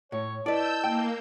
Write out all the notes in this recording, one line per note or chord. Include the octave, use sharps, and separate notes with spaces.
A2 C#5
E4 B4 D5 D#5 A5 E6 G6 A6
A#3 G5